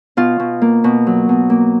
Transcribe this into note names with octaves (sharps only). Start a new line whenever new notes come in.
B2 F4
B2
A#3
B2
F#3
B2
A#3